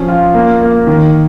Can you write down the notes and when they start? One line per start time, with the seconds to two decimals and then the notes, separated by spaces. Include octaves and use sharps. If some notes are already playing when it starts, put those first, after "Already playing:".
Already playing: F3 C#4
0.08 F4
0.34 A#3
0.61 A#3
0.87 D#3